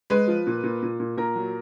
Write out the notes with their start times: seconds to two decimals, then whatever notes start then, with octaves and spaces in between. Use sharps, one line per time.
0.10 G#3 B4
0.28 F3
0.47 A#2
0.63 A#2
0.83 A#2
1.00 A#2
1.17 A#2 A#4
1.35 F#3